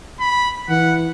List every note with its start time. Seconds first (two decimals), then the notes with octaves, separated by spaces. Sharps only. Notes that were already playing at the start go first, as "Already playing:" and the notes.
0.20 B5
0.69 E3 F#5